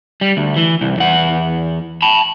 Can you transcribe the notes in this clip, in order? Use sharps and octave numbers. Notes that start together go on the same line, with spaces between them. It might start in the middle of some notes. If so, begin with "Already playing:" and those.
G3
D2
E3
C2
E2 F#5
A5 B5